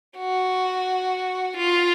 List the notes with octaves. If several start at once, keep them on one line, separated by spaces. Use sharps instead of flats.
F#4
F4